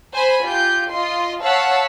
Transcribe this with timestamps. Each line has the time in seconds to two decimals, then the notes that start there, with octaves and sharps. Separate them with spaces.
0.13 C5 G#5 B5
0.45 F4 G4 G6
0.91 F4 D#5 C6
1.42 C#5 F5 F#5 A5 E6 B6